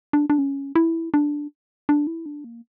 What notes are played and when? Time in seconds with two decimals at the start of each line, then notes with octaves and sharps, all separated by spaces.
0.13 D4
0.30 D4
0.38 C#4
0.75 E4
1.14 D4
1.89 D4
2.07 E4
2.26 D4
2.44 A#3